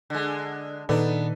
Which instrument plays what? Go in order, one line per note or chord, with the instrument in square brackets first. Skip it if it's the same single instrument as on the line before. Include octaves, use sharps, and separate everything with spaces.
[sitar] D3 G#3
[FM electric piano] A#2 D#3 D5 [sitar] B3 D4 [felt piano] D#4 A4 B4